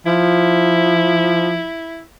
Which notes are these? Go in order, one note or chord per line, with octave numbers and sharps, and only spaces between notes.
F3 E4